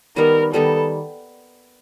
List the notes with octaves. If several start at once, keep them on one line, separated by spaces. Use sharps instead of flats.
D#3 G3 B3 D#4 A#4
D#3 G3 B3 D#4 A4